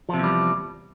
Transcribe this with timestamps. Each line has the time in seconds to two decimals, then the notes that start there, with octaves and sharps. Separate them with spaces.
0.09 F3
0.14 C3
0.19 E2
0.23 G3